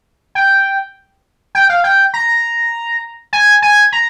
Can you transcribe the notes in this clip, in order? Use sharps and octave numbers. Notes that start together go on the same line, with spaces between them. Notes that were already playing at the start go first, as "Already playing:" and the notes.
G5
G5
F5
G5
A#5
G#5
G#5
A#5